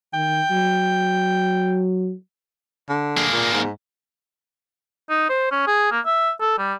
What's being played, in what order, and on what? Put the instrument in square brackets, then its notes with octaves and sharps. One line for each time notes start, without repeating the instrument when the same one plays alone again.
[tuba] D#3 [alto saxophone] G5
[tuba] F#3
[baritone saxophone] D3
[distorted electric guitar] A#3 G#4
[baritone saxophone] A#2
G#2
[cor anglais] D#4
C5
C#4
G#4
A#3
E5
A4
G3